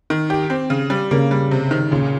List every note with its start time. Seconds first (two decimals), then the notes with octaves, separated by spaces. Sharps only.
0.10 D#3
0.30 G4
0.50 C4
0.70 C#3
0.90 G3
1.11 C#3 A#3
1.31 G3
1.51 C3
1.71 D#3
1.91 A#2 C#3